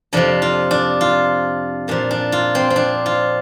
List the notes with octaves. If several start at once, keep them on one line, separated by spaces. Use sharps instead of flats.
F2 C3 F3 D4
F4
D4
F4
A#2 F3 D4
D4
F4
C4
C4
D4
F4